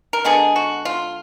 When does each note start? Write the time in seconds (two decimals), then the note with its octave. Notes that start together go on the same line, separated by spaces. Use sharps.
0.13 A#4
0.25 D3 G#3 B3 G#4
0.56 F#4
0.85 F4